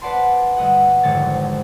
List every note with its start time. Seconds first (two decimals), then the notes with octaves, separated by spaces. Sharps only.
0.02 B4 D5 F#5 A5 C6
0.57 G1 A3 D#5 F#5
1.03 G#1 F2 G#2 D3 C#5 A6